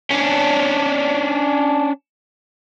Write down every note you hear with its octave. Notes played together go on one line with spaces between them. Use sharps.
C#4 D4